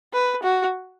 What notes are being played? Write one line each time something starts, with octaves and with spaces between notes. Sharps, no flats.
B4
F#4